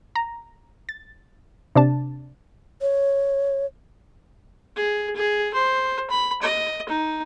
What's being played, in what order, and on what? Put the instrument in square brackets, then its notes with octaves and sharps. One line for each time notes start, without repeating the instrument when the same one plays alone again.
[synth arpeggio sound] A#5
A6
C3 D4 A5
[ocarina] C#5
[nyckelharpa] G#4
G#4
C5
B5
D#5
D#4